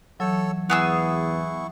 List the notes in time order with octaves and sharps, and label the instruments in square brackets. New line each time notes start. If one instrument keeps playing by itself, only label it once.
[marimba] E3 F#3 [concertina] A4 C#5 E6
[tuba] E2 [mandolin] B3 G#4 E6 [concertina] E4 C#6